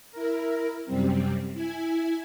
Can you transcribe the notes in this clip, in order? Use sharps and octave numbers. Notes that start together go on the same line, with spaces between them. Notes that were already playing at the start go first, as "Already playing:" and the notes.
E4 A#4
F#2 C3 G3 C4
E4 G#5